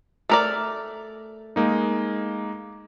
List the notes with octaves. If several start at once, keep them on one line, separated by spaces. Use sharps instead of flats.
A3 A#4 D5
G#3 A#3 D#4